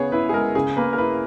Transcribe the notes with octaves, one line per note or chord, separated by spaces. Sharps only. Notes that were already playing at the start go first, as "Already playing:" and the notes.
Already playing: C#3 B3 G#4 C#5
E4 B4
G#4
G#3 A#4
C#3 G#4
A#3 B4
A#4
E4 B4